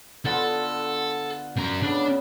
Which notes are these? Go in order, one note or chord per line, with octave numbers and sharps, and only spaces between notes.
D3 B3 F4 A4
F#2 D5 A#5
C#3 B3 D4